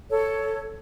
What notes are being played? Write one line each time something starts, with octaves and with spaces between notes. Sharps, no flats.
A4 C#5